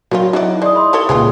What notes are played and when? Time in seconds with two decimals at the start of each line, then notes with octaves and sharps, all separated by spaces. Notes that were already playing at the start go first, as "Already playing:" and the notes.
0.11 D#3 F#3 G3 F4
0.33 F#3 D#4 E4 F#4 D5 D#5
0.62 G#3 D5 D#6
0.75 B5 C6 D#6
0.93 G4 A4 C#5
1.09 C#2 A#2 E3 G#3 F4